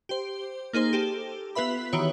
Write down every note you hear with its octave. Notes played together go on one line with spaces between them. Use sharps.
G4 C5
A#3 D#4 G#4 C5
G4 A4
B3 F4 B4 E5 B5
D#3 E3 F#4 G4 C#5